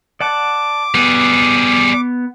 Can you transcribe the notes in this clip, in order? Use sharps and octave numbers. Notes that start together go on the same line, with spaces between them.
D5 F#5 A5 D6
G3 B3 G#4